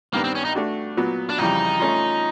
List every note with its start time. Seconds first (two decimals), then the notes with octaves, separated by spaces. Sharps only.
0.13 G2 D#3 G3 A#3 B3 D4
0.24 C4
0.35 C#4
0.45 D#4
0.55 A3 D4 F#4
0.97 A#2 F#3 B3
1.30 D4
1.38 F2 C#3 E3 G3 D#4
1.80 A3 C#4 F4